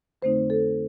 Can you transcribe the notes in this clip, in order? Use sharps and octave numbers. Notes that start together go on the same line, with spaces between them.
F2 D3 A3 C4 D#4 C5
A4